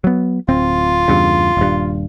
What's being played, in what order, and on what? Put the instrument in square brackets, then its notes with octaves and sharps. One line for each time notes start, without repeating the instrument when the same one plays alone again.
[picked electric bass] F#3 B3
[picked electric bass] D1 C4 [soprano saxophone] F4
[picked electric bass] E2 G2 C#3
D#1 G2